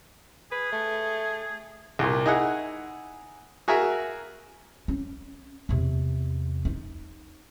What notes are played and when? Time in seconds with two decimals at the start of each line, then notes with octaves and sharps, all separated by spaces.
0.52 G#4 B4
0.72 A3
1.99 C2 A#2
2.26 D#4 E4 G#4 F#5
3.68 F#4 G#4 A#4 E5
4.88 C#4
5.69 E2 C3
6.65 D#4